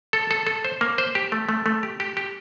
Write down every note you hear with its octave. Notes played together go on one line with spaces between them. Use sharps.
A4
A4
A4
C5
A#3
C5
G4
A3
A3
A3
G4
G4
G4